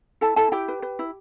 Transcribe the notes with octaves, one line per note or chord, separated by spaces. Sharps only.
E4 A4 A5
E4 A4 A5
E4 G4 G5
B4
B4
E4